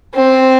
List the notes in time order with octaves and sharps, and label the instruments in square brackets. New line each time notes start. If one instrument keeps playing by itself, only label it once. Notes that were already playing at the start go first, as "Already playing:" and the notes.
[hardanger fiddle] C4